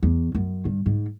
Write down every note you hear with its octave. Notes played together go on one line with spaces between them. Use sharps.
E2
F#2
G2
G#2